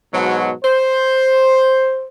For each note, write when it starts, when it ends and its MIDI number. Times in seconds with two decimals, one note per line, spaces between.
0.12 0.51 44
0.12 0.51 47
0.12 0.51 54
0.64 2.07 72